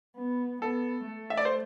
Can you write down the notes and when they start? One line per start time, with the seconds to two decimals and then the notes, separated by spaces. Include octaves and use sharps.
0.16 B3
0.62 B3 A4
1.07 A3
1.30 E5
1.37 D5
1.45 C5